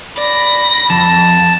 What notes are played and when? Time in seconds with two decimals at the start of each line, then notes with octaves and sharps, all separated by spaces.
0.18 D5 B5 A#6
0.90 F2 A5